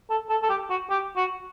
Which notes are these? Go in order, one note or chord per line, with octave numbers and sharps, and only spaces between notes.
A4
A4
A4
G4
F#4
G4
F#4